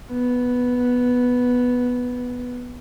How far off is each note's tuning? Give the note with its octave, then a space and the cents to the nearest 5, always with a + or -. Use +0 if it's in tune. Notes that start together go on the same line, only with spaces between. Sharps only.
B3 +0